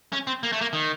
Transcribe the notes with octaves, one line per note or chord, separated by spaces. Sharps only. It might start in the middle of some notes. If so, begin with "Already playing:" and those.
C#4
C4
A#3
A3
A#3
D#3